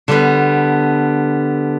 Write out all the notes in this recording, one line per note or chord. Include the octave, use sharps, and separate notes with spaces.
D3 G3 B3